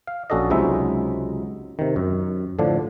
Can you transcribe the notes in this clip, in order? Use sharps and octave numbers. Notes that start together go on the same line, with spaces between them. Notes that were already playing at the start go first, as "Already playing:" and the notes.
F5
A#1 C#4 F#4 A4 D5 D#5
C#2 C3 F#3 G#3 D#4 E5
C3 D#3
F#2
A2 D3 F3 D4